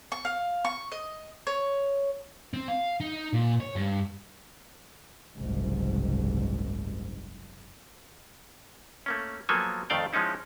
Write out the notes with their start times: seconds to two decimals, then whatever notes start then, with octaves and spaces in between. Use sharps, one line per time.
0.12 C#6
0.25 F5
0.65 C#6
0.92 D#5
1.47 C#5
2.54 C4
2.68 F5
3.00 D#4
3.33 A#2
3.60 C#5
3.76 G2
5.35 F#1 C2 G#2
9.06 A3 A#3 C#4
9.49 F3 F#3 A#3 B3 A4 G#5
9.90 F2 D#3 A3 D5 F5 G5
10.13 F3 G#3 C#4 D#4 E4